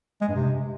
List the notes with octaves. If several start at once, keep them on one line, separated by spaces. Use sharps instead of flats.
G#3
G2
C3